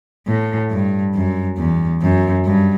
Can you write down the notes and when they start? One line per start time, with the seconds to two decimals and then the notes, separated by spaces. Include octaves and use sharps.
0.27 A2
0.71 G2
1.14 F#2
1.57 E2
2.02 F#2
2.45 G2